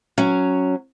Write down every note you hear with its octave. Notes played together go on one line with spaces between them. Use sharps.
F#3 C#4